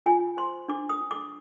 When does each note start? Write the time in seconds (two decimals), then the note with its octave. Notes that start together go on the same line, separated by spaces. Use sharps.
0.06 F4 G#5
0.37 C5 C6
0.68 D4 D6
0.89 D#6
1.01 D4
1.11 D6